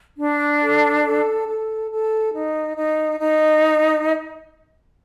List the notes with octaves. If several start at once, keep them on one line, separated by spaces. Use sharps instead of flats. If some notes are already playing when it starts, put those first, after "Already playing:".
D4
A4
A4
A4
A4
D#4
D#4
D#4